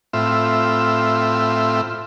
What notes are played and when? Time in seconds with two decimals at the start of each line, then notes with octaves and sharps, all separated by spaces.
0.13 A2 C4 F4 E5